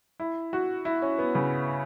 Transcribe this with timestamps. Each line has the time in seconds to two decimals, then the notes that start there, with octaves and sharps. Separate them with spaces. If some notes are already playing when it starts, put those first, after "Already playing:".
0.20 E4
0.53 F#4
0.85 E4
1.02 C#4
1.19 B3
1.35 C#3